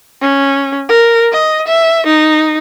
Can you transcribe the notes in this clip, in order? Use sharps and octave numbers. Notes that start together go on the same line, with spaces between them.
C#4
A#4
D#5
E5
D#4